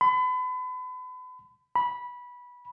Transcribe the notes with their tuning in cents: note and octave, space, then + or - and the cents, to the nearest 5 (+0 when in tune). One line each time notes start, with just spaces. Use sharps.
B5 +35
B5 -15